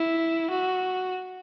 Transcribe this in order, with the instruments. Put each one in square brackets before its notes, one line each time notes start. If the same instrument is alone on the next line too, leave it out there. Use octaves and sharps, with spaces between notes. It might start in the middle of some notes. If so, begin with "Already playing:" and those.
Already playing: [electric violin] E4
F#4